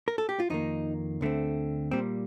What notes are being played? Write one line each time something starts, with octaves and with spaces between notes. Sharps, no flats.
A#4
A4
G4
F4
F2 D#3 A#3 D#4
D2 D3 A3 C4
A#2 G3 A#3 C4